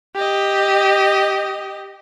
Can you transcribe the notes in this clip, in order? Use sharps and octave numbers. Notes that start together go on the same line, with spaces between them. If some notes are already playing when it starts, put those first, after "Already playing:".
G4 D#5